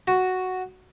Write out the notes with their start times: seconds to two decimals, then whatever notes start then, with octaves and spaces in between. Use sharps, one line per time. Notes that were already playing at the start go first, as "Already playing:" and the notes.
0.07 F#4